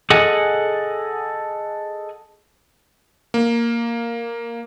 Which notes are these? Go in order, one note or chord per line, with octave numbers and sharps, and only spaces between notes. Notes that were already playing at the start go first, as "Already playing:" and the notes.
G#4 A4 D#5 F#5 G#5
A#3